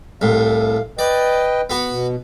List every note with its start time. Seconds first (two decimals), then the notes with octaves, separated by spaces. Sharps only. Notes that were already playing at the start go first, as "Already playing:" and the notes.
0.21 C2 A2 F5
0.99 B4 D5 D#5 G5
1.70 B3 F#4
1.90 B2